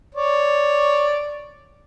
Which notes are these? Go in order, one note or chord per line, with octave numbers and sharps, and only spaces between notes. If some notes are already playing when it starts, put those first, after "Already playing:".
C#5 D5